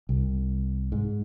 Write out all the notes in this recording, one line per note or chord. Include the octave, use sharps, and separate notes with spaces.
C2
G#2